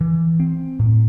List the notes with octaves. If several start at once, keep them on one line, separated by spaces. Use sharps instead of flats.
E3
C4
A2